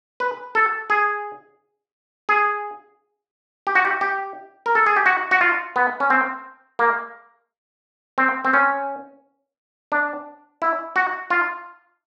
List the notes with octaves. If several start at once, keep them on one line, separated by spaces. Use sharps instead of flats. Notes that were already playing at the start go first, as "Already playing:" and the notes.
B4
A4
G#4
G#4
G4
F#4
G4
G4
A#4
A4
G#4
G4
F#4
F#4
F4
B3
C#4
C4
A#3
C4
C4
C#4
D4
E4
F#4
F4